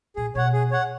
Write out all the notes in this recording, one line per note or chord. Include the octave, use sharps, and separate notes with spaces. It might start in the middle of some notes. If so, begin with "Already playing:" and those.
A#2 G#4
B2 C#5 F#5
G#4
C#5 F#5